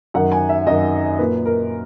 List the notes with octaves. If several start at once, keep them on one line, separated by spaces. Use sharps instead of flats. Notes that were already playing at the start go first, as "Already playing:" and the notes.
F#2 D#3 F#5
G#5
E5
F#2 D#3 D#5
A#2 B4
A#4